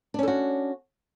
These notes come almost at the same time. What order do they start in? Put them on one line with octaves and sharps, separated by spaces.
D4 C#4 A4 F#4